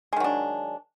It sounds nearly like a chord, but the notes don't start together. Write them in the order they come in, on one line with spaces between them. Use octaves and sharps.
G#3 D#3 F#3 D4